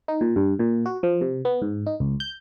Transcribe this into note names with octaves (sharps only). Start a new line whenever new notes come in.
D#4
A#2
G2
A#2
F#4
F3
C3
B3
G#2
D#4
C#2
G6